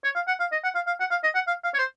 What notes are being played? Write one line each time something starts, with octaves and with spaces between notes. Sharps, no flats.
C#5
F5
F#5
F5
D#5
F#5
F5
F5
F#5
F5
D#5
F#5
F5
F5
C#5
C5